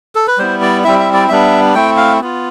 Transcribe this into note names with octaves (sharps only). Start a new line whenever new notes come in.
A4
B4
G3 B3 E4 C5
D5
G3 C4 E4 E5
E5
D5
G3 B3 D4 E5
A3 C4 E4 G5
F5
B3 F4